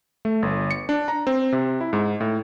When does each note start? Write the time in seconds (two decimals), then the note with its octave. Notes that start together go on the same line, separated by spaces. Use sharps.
0.25 A3
0.42 G1
0.71 C#7
0.89 D4
1.08 A#5
1.27 C4
1.52 C3
1.81 E4
1.93 G#2
2.20 A2